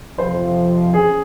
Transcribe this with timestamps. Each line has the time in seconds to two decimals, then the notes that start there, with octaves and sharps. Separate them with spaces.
0.17 F2 C3 F3 C5
0.94 C#4 G#4